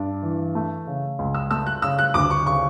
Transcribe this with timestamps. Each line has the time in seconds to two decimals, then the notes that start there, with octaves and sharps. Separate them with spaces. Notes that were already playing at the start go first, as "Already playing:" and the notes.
Already playing: G2 D4
0.22 E3
0.55 A3
0.87 C#3
1.19 C#2
1.34 E6
1.51 A3 E6
1.66 F#6
1.82 C#3 E6
1.99 F#6
2.14 D2 D6
2.30 C#6
2.46 C#3 C#6